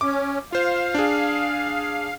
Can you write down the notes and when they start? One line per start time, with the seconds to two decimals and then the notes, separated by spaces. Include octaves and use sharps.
0.01 C#4 D6
0.52 F4 C5 F5
0.94 D4 G#4